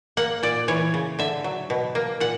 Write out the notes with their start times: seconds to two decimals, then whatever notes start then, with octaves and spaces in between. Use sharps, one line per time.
0.17 A#3 F#5
0.43 A#2 D5
0.68 E3 C#5
0.94 C#3
1.19 D3 E5
1.44 F#3
1.70 B2
1.95 A#3
2.20 A#2 F#5